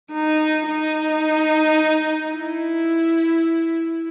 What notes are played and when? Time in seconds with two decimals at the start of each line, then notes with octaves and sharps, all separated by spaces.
0.13 D#4
0.69 D#4
2.35 E4